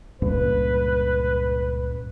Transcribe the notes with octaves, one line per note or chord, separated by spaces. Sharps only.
C#2 G2 A#2 B4